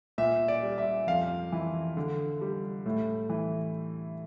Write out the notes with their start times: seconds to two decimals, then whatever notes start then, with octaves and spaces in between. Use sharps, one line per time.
0.18 A#2 E5
0.48 D5
0.63 G3
0.78 E5
1.07 F2 F5
1.52 E3
1.97 D3
2.41 G3
2.86 A2
3.30 E3